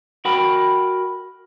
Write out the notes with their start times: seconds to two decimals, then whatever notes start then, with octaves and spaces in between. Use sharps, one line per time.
0.25 F#4 A#4 F#5 G5 B5